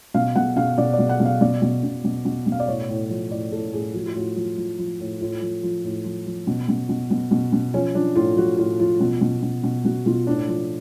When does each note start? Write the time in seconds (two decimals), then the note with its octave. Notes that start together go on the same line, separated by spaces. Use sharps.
0.14 B2 F5
0.35 B2 F#5
0.57 B2 F5
0.78 B2 D5
0.93 D5
0.99 B2
1.09 F#5
1.20 B2
1.25 F5
1.41 B2 D5
1.62 B2
1.84 B2
2.04 B2
2.25 B2
2.47 B2
2.52 F5
2.60 D5
2.68 A2 C#5
2.89 A2
3.10 F3
3.31 A2 D5
3.52 A2 A4
3.73 A2 G#4
3.94 F3 F#4
4.06 F4
4.15 A2 F#4
4.36 F3
4.57 F3
4.79 F3
5.00 A2
5.21 A2 F4
5.42 F3
5.63 F3
5.84 A2
6.05 F3
6.26 F3
6.47 B2
6.68 B2
6.89 B2
7.11 B2
7.31 B2
7.53 B2
7.74 F3 C#4
7.95 F3 D4
8.15 A2 F4
8.37 F3 F#4
8.58 A2 F4
8.79 F3 F4
9.00 B2
9.21 B2
9.42 B2
9.64 B2
9.85 B2 F#4
10.06 B2 F4
10.27 A2 D4
10.48 F3